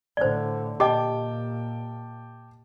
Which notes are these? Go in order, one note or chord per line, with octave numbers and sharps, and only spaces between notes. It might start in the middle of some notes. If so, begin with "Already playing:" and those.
A2 D3 C5 D5
A#2 G4 D#5 G5 A5 D6